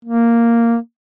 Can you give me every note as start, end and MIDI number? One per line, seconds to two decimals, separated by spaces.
0.05 0.76 58